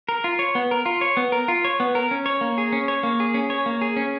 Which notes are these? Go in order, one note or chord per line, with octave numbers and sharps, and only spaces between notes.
A#4
F4
C#5
B3
A#4
F4
C#5
B3
A#4
F4
C#5
B3
A#4
C#4
C#5
A#3
G#4
C#4
C#5
A#3
G#4
C#4
C#5
A#3
G#4
C#4